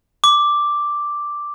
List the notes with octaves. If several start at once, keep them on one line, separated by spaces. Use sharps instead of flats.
D6